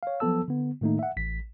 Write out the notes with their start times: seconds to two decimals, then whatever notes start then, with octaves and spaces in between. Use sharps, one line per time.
0.03 C#5 F5
0.20 F3 F#3 B3 A4 A5 E6
0.48 D3 B3
0.81 A2 D#3 A3 A#3 D#4
0.99 E5 F#5
1.17 A1 B6